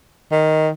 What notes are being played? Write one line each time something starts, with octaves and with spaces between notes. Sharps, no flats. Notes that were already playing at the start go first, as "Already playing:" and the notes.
D#3